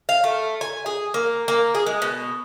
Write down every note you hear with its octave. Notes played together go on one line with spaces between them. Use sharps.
F5
A3
G#5
G#4
A#3
A#3
G#4
G#3
B2